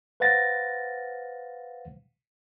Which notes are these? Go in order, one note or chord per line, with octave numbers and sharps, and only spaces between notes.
B4 C5 F5 F#5 A6 A#6